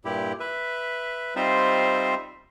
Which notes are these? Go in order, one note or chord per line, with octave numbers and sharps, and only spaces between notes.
G2 A#2 E4 G4
B4 E5
G3 C4 D#4 F4 C5 E5